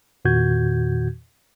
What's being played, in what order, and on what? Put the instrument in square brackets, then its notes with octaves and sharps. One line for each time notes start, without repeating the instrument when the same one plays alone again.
[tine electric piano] E2 A#2 D#3 F#4 G6 G#6